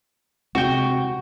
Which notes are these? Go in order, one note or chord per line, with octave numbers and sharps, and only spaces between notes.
C3 G#3 C4 F#4 G5